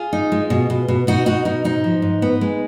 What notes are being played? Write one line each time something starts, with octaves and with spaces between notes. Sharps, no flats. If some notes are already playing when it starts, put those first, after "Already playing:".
Already playing: F4 G#4
D#4
G#3
B2
B2
B2
B2 D#4 F#4
B2 D#4 F#4
B2 D#4
G#2 D#4
F3
G#2
B3
G#3